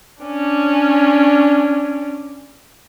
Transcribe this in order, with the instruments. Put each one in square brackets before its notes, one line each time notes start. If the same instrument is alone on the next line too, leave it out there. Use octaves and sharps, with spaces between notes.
[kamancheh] C#4 D4